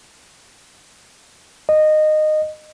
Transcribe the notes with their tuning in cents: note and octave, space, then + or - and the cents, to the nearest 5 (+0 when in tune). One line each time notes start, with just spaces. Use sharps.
D#5 -15